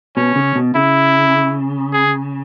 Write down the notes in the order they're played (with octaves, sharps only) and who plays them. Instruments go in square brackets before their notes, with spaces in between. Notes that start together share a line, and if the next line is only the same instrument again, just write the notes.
[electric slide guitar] B2 [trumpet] C#4
[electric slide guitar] C#3
B2
[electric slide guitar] C#3 [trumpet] E4
[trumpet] G#4